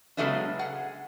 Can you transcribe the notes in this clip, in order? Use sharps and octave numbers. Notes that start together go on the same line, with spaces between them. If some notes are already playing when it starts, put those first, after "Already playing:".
C#3 F#3 G#3 A3 B3 D4
G#4 F#5